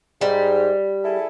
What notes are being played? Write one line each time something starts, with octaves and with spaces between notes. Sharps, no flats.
G#2 G3
E4 G#4 A4